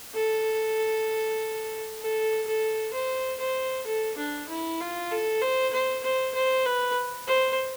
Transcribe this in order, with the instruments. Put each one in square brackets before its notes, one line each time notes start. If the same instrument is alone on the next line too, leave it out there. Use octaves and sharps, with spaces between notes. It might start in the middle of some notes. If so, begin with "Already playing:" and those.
[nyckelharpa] A4
A4
A4
C5
C5
A4
D4
E4
F4
A4
C5
C5
C5
C5
B4
C5